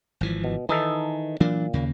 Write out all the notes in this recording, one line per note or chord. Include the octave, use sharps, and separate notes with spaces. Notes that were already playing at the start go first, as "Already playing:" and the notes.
G#1 E3 F3
B2
D#3 E3 D#4 A4
A#2 E3 F#3 D4
D#2 C#3 A#3